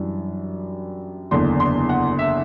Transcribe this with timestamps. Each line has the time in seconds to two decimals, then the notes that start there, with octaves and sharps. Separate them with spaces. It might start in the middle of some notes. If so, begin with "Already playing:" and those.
Already playing: F#2 E3 G3 D4
1.31 F#1 E2 D3 C6
1.60 C6
1.89 F#5
2.19 E5